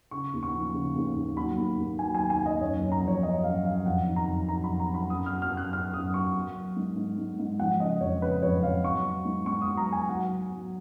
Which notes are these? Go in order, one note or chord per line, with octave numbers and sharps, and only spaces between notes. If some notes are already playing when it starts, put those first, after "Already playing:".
C#3 C#6
D#2
C#6
F3
C#3
D#2
D#2
F#3 B5
D#2
D#2
F#3 G#5
D#3 G#5
G#5
D#2
D#5
F#2 C#5
F#2
A#5
F3
C#5
F#2 D#5
F#2 F5
F#2 F5
F2 F#5
D#3
A#5
F2
F#3 A#5
F2 B5
A#5
F#3 B5
F#2 D#6
F#3 F6
F6
F#2
F#6
F#2 F6
F#2 D#6
F#3 C#6
F#3
F#3
G#2
G#2
G#2
G#2
F3 F#5
C#3 D#5
F2 C#5
C#3 B4
F2 C#5
F2 F5
F#3 C#6
F#3
G#2
G#2 C#6
D#6
F#3
A#5
F#3
G#5
F#3 F#5
F#3
F#3